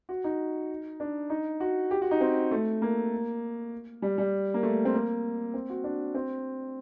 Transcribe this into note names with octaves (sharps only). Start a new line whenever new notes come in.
F#4
D#4
D4
D#4
F#4
G4
F#4
D#4
C4
A3
A#3
G3
G3
A#3
A3
C4
A#3
C4
F#4
D4
C4